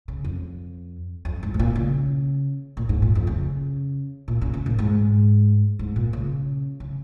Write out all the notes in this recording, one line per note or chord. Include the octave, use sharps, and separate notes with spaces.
C#3
F2
F2
G#2
G#2
A#2
C#3
A#2
G#2
A#2
F2
C#3
A#2
C#3
C#3
A#2
G#2
G#2
A#2
C#3
C#3